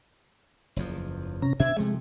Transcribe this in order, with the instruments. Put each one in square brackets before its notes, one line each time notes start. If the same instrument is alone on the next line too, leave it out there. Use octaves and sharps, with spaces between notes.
[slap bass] F#1 E2 F3
[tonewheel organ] C3 C#4 A#5
[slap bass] B2 D4 [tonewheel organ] E5 G#6
[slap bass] C3 F3 A3 [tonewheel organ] G#3